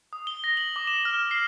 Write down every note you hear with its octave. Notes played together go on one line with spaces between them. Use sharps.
D#6
G7
A#6
F#7
D6
E7
F6
C7